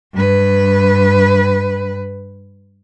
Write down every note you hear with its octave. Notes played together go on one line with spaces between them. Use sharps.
G2 B4